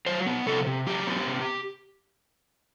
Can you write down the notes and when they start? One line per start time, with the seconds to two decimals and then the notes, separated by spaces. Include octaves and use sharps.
0.06 F#3 C5
0.26 B3
0.46 C3 A4
0.66 C3
0.86 F#3 G4
1.07 B3
1.27 C3